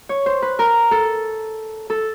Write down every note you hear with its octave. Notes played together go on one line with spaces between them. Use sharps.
C#5
C5
B4
A#4
A4
A4